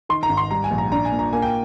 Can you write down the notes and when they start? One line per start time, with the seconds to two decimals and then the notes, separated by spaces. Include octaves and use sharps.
0.09 D#3 C6
0.23 A#5
0.29 G#1
0.37 C6
0.51 G3 A#5
0.64 G#5
0.71 A#1
0.78 A#5
0.92 D4 A#5
1.05 G#5
1.12 A#2
1.19 A#5
1.33 A#3 G#5
1.42 G5